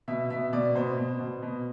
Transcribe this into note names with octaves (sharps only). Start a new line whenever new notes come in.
B2 E5
B2 E5
B2 D5
B2 C5
B2
B2
B2